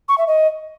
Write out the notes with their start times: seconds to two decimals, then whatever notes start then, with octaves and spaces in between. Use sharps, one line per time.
0.08 C#6
0.18 E5
0.27 D#5